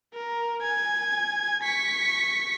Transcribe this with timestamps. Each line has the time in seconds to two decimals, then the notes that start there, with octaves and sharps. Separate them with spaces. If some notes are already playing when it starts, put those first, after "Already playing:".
0.14 A#4
0.62 G#5 G#6
1.63 C#6 B6